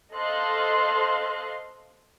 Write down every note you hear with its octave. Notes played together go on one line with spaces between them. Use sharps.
A4 C5 D#5 F5 C6 F#6